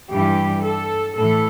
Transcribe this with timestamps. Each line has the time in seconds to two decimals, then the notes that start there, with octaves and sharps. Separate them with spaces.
0.11 G2 E3 G3 G4
0.64 A4
1.17 A2 E3 A4